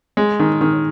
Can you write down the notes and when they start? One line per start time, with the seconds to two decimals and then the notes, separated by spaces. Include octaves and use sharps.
0.17 G#3
0.40 D#3
0.61 D#3